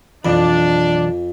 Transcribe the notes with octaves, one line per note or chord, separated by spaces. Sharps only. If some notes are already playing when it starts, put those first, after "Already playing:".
B1 F2 E3 D4 B5